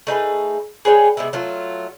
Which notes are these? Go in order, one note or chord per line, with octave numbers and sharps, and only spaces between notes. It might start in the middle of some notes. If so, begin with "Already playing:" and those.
A3 D#4 G#4 B4
G#4 B4 C#5 G5
C3 G#3 B3 E4
F#3 A3 F4